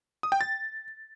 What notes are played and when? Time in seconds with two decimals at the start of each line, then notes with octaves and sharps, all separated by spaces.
0.23 D#6
0.32 G5
0.41 A6